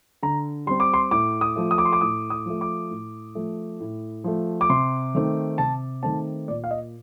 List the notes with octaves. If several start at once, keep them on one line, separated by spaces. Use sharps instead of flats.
D3 A#5
G3 C4 C6
D6
C6
A2 D6
D#6
F3 A3
D#6
D6
C6
D6
A2 D#6
D#6
F3 A3
D6
A2
F3 A3
A2
F3 A3
D6
C3 C6
D#3 A3 C4
C3 A5
D#3 A3 C4 A5
A#2 D5
F5
D#5